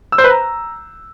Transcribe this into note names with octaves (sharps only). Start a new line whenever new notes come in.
E6
C5
B4
A#5